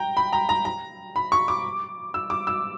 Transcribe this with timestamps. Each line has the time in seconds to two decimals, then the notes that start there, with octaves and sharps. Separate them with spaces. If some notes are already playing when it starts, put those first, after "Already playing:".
Already playing: G5 A#5
0.17 B5
0.33 A#5
0.49 A#5
0.65 A#5
1.16 B5
1.32 C#6
1.48 D6
2.14 E6
2.30 D6
2.47 E6